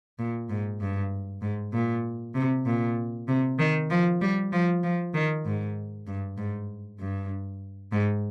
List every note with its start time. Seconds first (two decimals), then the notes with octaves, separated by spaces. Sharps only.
0.19 A#2
0.49 G#2
0.80 G2
1.42 G#2
1.73 A#2
2.34 C3
2.66 A#2
3.28 C3
3.59 D#3
3.90 F3
4.21 G3
4.53 F3
4.83 F3
5.14 D#3
5.45 G#2
6.07 G2
6.38 G#2
7.00 G2
7.92 G#2